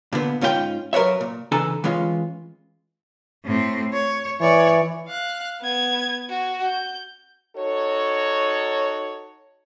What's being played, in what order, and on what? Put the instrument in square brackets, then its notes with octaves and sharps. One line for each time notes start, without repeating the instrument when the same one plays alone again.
[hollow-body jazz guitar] A#2 D3 B3
G#2 C#4 F4 F#4 G5
F#2 A#4 B4 C#5 E5
A#2
C#3 E3 D4 A4 G#5 A#5
E3 G#3 C#4 F4
[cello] A2 C4
C#5
[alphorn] E3 [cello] C#5 D5
[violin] F5 F#6
B3 G#6
F#4
G6
[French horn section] D#4 F#4 A4 C#5